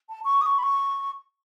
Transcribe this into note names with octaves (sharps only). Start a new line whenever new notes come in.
A5
C#6
D#6
C#6
B5
C#6